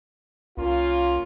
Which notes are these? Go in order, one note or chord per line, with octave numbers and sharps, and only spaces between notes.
C2 A#3 C#4 F4